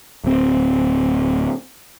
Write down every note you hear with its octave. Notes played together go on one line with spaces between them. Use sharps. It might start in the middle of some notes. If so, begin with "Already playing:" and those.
D1 C4